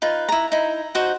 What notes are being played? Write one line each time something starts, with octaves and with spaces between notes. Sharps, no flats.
D#4 F4 B4
E4 A#5
D#4 E4
D#4 F#4 C5